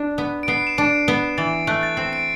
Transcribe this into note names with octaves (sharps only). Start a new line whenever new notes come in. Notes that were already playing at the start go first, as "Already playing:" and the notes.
Already playing: D4
B3
D7
B3 C7
E7
D4 D7
B3
E3 A6
A3 F#6
A6
C4 C7
D7